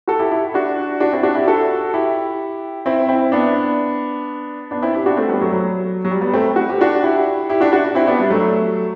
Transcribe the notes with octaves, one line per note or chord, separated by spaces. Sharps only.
F#4 A4
E4 G4
E4 G4
D4 F#4
D4 F#4
C4 E4
D4 F#4
E4 G4
F#4 A4
E4 G4
C4 E4
C4 E4
B3 D4
B3 D4
C4 E4
E4 G4
D4 F#4
A3 C4
G3 B3
F#3 A3
F#3
F#3
G3
G3 B3
A3 C4
F#4
G4
D4 F#4
E4 G4
E4 G4
D4 F#4
D4 F#4
C4 E4
B3 D4
G3
F#3 A3